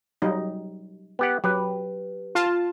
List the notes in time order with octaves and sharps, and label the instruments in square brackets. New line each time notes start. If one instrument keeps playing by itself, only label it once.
[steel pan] F#3 G3 D#4
[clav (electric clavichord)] B3 G4 F#5
[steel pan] F#3 [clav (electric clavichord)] G4 B4
[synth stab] F4 A5